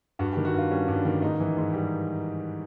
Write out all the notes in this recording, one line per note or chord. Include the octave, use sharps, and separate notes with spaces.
G2 F#4
G4
D#3
F#4
G2 F4
G3 C#4
G2
D4
D#3
G#2 D#4
E3
G#2
G3